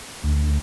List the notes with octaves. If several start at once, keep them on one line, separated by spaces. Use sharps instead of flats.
D2